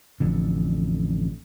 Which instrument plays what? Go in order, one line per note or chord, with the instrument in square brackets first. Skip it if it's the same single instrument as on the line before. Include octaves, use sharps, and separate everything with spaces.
[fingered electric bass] A1 F2 D3